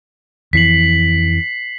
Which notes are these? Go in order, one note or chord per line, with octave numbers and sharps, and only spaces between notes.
F2 E3 B6 C7 F#7